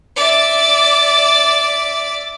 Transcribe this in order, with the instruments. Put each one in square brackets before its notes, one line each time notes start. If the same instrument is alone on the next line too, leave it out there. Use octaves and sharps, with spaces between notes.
[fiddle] D5 E5